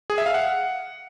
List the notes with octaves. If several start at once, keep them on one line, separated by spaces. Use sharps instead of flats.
G#4
E5
F5
F#5